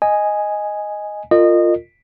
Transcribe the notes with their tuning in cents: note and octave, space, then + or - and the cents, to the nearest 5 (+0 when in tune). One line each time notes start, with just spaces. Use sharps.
D#5 +0 G#5 +0
F4 +0 A#4 -30 D#5 -25